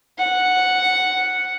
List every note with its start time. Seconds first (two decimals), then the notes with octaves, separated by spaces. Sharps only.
0.18 F#5